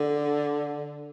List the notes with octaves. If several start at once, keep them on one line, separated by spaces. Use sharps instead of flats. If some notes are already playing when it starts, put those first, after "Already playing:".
Already playing: D3